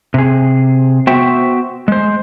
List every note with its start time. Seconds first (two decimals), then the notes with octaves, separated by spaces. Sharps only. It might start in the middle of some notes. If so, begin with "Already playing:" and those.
0.14 C3 G#4
1.07 B3 F#4 C5 E5 G5
1.88 G#3 C5